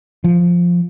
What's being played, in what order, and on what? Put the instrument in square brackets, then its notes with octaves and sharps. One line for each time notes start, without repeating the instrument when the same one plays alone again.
[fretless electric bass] F3